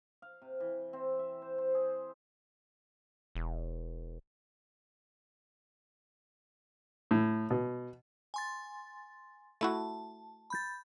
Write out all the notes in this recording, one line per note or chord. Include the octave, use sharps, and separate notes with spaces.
F5
C3
E3
C4
E5
C5
C5
G#4
E1
A2
B2
G#5 C6 A6
A3 E4 F#4 A5
B5 G6 A6